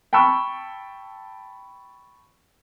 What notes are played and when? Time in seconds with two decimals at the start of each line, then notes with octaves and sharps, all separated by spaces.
0.13 G5 A5 B5 C#6 E6